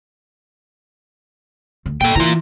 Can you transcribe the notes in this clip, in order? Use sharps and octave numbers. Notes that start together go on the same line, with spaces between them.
D2
A#2 A4 G5
E3 F4 A#5